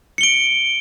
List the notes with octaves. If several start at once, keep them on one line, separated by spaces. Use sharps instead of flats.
C#7 D7 G7